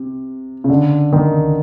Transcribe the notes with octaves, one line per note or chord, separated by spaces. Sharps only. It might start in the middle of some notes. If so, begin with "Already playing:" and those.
Already playing: C3
C#3
D3
D#3